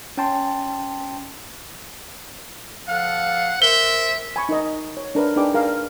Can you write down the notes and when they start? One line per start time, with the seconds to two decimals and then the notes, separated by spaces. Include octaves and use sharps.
0.18 C#4 G5 A5 C6
2.89 F3 A4 F5 F#5
3.62 A#4 C5 E5 G7
4.36 G#5 B5 C#6
4.49 D#4 A#4 D#5
4.97 C#5
5.15 D4 A#4 B4
5.36 D4 D#4 G#4 B4 G5 D6
5.54 G#4 A#4 F5